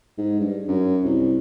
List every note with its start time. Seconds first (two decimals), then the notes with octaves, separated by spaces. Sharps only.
0.18 G#2
0.40 G2
0.68 F#2
1.04 C2